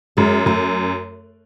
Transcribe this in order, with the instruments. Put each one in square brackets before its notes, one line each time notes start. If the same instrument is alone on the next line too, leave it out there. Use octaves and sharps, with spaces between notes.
[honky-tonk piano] F#2 [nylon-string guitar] G#3
[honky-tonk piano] F#2 [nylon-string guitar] A3